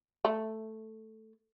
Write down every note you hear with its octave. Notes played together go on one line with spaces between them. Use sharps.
A3